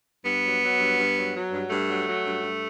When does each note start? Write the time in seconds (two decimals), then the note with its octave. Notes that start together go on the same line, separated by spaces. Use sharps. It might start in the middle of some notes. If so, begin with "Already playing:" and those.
0.25 G2 B3
0.44 F#3
0.61 F#3
0.80 G2
0.98 G2
1.16 F#3
1.35 F#3
1.53 G2
1.70 G2 A3
1.89 F#3
2.07 F#3
2.26 G2
2.43 G2